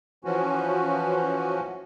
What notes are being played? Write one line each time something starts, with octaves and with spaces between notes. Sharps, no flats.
E3 F3 C#4 F#4